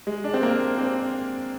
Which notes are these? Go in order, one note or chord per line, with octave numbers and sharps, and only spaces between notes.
G#3
D4
C4
A#3
C4